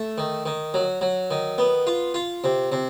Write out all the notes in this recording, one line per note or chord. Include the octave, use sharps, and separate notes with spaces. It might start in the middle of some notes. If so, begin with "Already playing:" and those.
Already playing: A3
D#3
D#3
F#3
F#3
D#3
B3
F4
F4
C3
C3